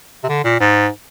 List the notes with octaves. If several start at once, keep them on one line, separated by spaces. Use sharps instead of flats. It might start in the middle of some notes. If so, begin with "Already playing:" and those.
C3
D3
A#2
G#2